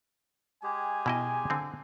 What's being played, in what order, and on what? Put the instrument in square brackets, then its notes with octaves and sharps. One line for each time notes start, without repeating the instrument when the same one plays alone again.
[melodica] G#3 G4 G#4 [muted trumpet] G#5
[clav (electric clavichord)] B2 E4 D#5
D3 C4